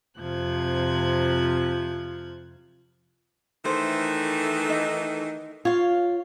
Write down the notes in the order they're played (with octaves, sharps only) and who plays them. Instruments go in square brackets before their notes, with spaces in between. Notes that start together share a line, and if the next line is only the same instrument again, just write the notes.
[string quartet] F2 C3 F3 F#6 G#6
[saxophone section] D#3 E3 A3 [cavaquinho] C5
[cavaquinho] D#4
[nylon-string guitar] F4 [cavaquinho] C#5 F5